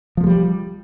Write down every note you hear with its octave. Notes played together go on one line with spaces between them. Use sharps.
F3 G3 G#3 A#3